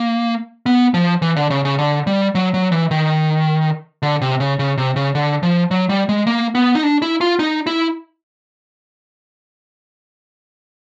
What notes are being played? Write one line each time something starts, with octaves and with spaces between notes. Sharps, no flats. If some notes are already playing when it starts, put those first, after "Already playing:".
Already playing: A#3
B3
F3
E3
D3
C#3
C#3
D3
G3
F#3
F#3
E3
D#3
D3
C3
C#3
C#3
C3
C#3
D3
F3
F#3
G3
G#3
A#3
B3
D#4
D4
E4
F4
D#4
E4